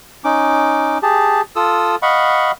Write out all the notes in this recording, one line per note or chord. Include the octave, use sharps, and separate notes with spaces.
C#4 D#4 D6
G4 G#4 A5
F4 A4 D#6 E6
D#5 F5 F#5 B5 C#6